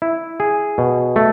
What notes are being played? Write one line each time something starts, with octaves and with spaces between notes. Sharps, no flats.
E4
G#4
B2
A3